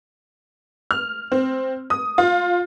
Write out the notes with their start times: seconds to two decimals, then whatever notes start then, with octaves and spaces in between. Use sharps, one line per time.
0.91 F6
1.32 C4
1.90 D#6
2.18 F4